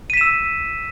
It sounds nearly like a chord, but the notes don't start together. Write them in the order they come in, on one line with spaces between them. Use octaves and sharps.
D#7 B6 E7 E6